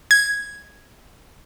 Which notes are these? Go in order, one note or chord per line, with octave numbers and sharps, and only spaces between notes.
G#6